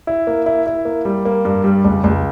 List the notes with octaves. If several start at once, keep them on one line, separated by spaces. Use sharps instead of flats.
E4
A#3
E4
E4
A#3
G3
A#3
G2
G3
C#2
C#2